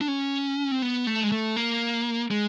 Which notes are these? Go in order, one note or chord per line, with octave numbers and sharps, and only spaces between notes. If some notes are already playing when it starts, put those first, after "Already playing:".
D4
C#4
C4
B3
A3
G#3
A3
A#3
G#3